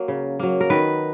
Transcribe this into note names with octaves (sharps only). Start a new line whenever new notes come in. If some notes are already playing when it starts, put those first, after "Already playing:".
Already playing: F#3 A#3
C#3
F#3 A#3
A#4
D#3 B4